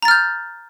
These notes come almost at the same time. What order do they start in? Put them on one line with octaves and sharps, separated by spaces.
A#5 A6 F6 G6